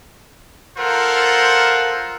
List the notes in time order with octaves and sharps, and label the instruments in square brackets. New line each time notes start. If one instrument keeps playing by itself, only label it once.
[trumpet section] F4 A4 A#4 C5 F#5